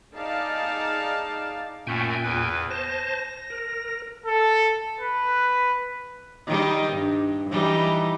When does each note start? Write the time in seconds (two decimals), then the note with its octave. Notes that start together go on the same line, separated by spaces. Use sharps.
0.15 D#4 G#4 D5 F5 A5
1.87 F#2 A#2 A3 G5 G#5
2.23 E2 B4
2.70 C5 A5 A#6
3.50 A#4
4.26 A4
5.00 B4
6.47 D#3 G3 D#4
6.92 G2
7.50 E3 G3 D#4